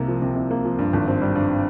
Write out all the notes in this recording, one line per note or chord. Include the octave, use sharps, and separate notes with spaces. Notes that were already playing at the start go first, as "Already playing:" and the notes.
Already playing: C2 C3 A#3
F3
C3
C2
A#3
F3
G2
G#1
C4
G3
G2